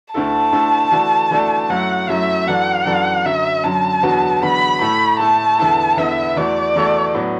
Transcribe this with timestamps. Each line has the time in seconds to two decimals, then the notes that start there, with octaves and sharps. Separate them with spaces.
0.14 D2 D3 A3 E4 A4 A5
0.53 D2 D3 A3 E4 A4
0.92 E3 A3 D4 F#4 A4
1.31 E3 A3 D4 F#4 A4
1.70 F#2 F#3 A3 E4 F#5
2.09 F#2 F#3 A3 E4 E5
2.47 F#2 E3 D4 F#4 A4 F#5
2.86 F#2 E3 D4 F#4 A4
3.25 F#2 D3 F#3 E5
3.64 F#2 D3 F#3 A5
4.03 E2 D3 F#3 B3 F#4
4.42 E2 D3 F#3 B3 F#4 B5
4.81 A2 A3 E4 A4 B5
5.19 A2 A3 E4 A4 A5
5.59 E2 D3 B3 E4 A4
5.97 E2 D3 B3 E4 A4 E5
6.36 E2 E3 A3 F#4 A4 D5
6.76 E2 E3 A3 F#4 A4
7.14 A2 F#3 B3 D4